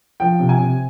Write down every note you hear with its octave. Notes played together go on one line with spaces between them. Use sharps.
F3 G5
C3
G#5
C3